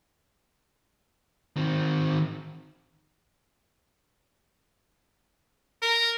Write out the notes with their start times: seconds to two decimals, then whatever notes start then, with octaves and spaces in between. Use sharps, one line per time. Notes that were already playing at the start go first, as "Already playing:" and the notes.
1.57 D#3 C4
5.82 A#4